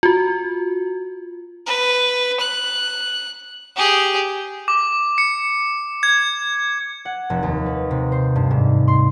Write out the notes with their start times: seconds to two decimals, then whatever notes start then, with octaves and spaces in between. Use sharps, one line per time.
0.03 F4 F#4
1.66 B4
2.40 F#6
3.76 G4 G#4
4.68 D6
5.18 C#7
6.03 G#6
7.05 F#5
7.30 F1
7.43 D#2
7.66 B4
7.91 C3
8.12 C5
8.36 G2
8.51 G#2
8.88 C6